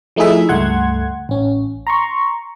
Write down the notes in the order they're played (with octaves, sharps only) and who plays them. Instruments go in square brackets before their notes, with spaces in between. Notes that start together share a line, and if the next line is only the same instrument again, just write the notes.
[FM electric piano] F3 A3 D#4 E4 G#4 E5
C#2 G2 A3 F#5 C6 G#6
A1 C#4
A#5 C6 C#6